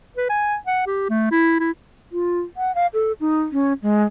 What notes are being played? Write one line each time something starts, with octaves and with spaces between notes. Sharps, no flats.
B4
G#5
F#5
G4
A3
E4
E4
F4
F#5
F5
A4
D#4
C#4
G#3